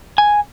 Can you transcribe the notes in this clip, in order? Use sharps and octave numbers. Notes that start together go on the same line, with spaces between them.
G#5